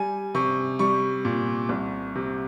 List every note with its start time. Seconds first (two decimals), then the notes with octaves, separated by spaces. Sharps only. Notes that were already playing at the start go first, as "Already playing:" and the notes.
Already playing: G3 G#5
0.35 C3 C#6
0.79 G3 C#6
1.25 A#2
1.69 C2
2.15 C3